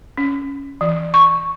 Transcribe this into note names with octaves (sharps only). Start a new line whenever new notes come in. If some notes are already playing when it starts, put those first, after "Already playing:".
C#4
E3
C#6